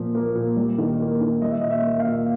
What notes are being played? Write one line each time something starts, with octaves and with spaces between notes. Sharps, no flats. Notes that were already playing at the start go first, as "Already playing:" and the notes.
Already playing: A#2 F3
A#3
A#2
G3
D#3
A#3
D#3
G3 D#5
E5
A#2 D#5
E5
A#3
F5
A#2